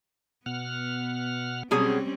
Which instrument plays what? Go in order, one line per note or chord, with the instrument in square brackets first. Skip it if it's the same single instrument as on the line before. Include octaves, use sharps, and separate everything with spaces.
[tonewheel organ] B2 F#5 F6 [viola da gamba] B3
[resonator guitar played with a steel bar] B2 F#3 G#4 [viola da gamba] G3 C4 C#4